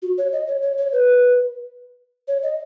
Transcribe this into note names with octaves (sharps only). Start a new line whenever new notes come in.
F#4
C#5
D#5
C#5
C#5
C#5
B4
C#5
D#5